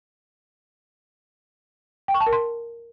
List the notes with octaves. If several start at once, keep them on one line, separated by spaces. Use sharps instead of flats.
G5
C#6
A5
A#4
C6